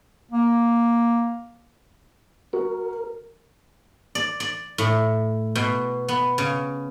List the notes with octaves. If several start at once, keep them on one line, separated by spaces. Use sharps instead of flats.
A#3
F#4 A#4
D5
D5
A2
B2
B3
C#3